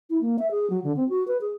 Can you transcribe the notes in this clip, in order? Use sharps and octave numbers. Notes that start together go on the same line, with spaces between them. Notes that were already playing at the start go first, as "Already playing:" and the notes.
E4
A#3
E5
G#4
F#3
D3
C4
F#4
B4
G#4